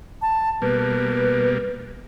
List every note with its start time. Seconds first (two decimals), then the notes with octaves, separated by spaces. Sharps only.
0.22 A5
0.62 B2 G3 A#3 B4